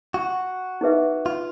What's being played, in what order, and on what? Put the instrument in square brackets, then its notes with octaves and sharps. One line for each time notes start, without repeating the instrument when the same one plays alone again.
[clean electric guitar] F#4
[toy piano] D#4 G#4 B4 E5
[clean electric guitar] F4